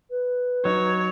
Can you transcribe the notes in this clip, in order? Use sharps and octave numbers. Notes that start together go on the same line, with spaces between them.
B4
F#3 D#4 C#5